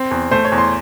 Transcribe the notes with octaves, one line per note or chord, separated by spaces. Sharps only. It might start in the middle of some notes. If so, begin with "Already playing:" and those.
Already playing: C4
E2
A3 C5
C#5
E2
C6